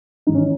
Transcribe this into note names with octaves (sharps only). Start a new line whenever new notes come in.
G#1 G#2 E3 D#4
C#4